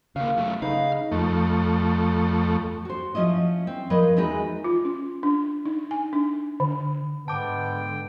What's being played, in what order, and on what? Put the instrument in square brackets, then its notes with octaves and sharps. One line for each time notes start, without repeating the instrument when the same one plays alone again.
[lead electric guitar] C#3 A#3 [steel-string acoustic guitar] F5
[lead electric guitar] F#2 A3
[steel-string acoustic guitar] C#3 D#4 B4 [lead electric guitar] F5
[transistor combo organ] F2 A3
[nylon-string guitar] F#4 C5
F3 C#4 E4 D#5
C4
F3 A#4 B4 C#5 D#5
E2 E3 G#3 D#4 F#4 B4
[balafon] F4
C#4
D4
D#4
G#5
D4
D3
[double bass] G#2 D3 [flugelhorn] B3 [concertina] G5 [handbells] A5 D6